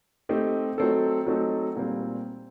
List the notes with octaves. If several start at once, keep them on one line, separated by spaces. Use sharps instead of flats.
A3 C4 D#4 G4
F#3 A3 C4 D#4 A4
F#3 A3 C4 D#4 A4
A#2 G3 C4